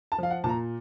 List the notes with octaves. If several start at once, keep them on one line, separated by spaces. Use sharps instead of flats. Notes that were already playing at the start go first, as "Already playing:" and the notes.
A5
F3 F5
F#5
A#2 A5
A#5